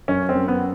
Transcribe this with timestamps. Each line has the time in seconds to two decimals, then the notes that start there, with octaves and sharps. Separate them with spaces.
0.08 F#2 C#4
0.29 C4
0.35 F#2
0.48 B3